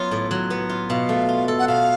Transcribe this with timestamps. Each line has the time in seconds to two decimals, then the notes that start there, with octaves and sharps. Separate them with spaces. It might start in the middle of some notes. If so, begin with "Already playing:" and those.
Already playing: F#3 B3 F4 C#5
0.11 A2
0.31 F#3
0.50 B3
0.69 F4
0.90 B2 F5
1.09 A3
1.29 F4
1.48 A4
1.59 F#5
1.68 B2 F5